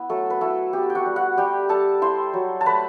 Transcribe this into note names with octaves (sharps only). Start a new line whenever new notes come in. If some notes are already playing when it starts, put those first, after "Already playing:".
Already playing: B3 E4
F#3 A3 A4
B4
A3 E4 A4
B3 G4
G5
F#4 F#5
G3
F#4 F#5
G3 G4 G5
G3 A4 A5
E4 C5 C6
F#3
A5
A3 B4 B5